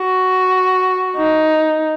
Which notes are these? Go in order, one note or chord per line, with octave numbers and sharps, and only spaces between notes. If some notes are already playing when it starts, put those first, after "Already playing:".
Already playing: F#4
D#4